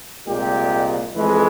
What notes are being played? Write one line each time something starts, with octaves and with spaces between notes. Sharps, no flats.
C2 A#2 G#3 G4
F2 E3 G#3